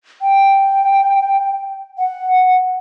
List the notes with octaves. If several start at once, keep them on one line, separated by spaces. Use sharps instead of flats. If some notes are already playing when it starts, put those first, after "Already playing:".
G5
F#5